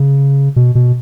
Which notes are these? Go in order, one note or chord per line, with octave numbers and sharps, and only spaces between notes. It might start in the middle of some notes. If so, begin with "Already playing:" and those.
Already playing: C#3
B2
B2